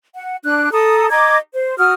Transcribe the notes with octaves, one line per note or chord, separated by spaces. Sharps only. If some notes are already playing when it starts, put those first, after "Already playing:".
F#5
D4 F#6
A4 A#5 D#6
D#5 A#5 D6 G#6
C5
F#4 D#6 F6